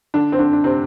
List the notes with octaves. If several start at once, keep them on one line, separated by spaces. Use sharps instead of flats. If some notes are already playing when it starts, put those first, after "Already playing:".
D3 D4
C4
D3 D4
D4
C3 C4